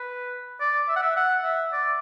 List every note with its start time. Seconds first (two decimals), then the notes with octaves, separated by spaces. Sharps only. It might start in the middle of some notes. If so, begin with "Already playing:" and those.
Already playing: B4
0.61 D5
0.89 E5
0.96 F#5
1.03 E5
1.17 F#5
1.44 E5
1.73 D5